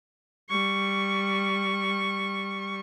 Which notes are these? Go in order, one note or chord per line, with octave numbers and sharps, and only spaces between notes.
G3 C#6